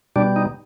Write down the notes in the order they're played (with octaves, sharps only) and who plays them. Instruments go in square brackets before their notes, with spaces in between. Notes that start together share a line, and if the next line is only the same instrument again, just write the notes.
[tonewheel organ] B2 G3 D4
D#4